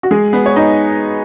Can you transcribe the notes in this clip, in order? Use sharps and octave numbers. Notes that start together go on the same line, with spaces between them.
F#4
G#3 G#4
B3 B4
C#5
D#4 D#5